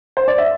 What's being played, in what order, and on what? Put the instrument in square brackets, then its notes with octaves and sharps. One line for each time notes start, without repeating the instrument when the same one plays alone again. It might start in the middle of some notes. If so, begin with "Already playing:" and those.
[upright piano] C5
D5
E5